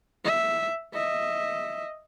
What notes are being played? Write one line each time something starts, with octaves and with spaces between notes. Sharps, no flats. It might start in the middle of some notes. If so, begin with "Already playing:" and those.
E5
D#5 E5